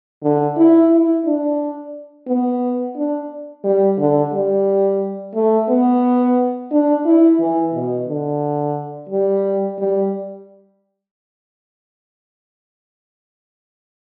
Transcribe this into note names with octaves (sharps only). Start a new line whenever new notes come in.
D3
E4
E4
D4
B3
D4
G3
D3
G3
A3
B3
D4
E4
E3
B2
D3
G3
G3